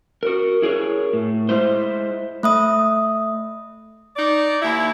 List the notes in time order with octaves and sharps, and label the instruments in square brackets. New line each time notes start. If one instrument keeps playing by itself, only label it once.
[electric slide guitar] F#4 A#4
E4 G#4 A#4 C#5
A2
G#3 E4 C5
[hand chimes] A3 E5 D#6
[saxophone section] D#4 D5
D#2 E4